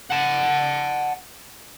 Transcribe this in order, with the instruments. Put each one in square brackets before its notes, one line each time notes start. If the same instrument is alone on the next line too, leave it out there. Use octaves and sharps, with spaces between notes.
[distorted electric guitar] F#5 A5